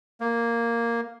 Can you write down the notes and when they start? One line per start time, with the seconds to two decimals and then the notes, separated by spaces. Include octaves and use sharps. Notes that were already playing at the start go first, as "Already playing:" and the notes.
0.20 A#3